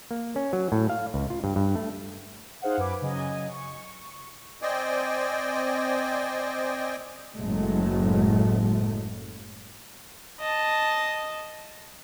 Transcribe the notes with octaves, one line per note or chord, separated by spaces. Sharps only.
A#3
C#4
F#3
A2
F5
C#2
F4
G2
G2
A3
D#4 G#4 C5 F5 F#5
F#2 B4 G#5 D6
C#3 F#3 D#5 G#5
C#6
C4 C5 D5 D#5 G5 G#5
F#1 F#2 A2 F#3 G#3 A3
D#5 A5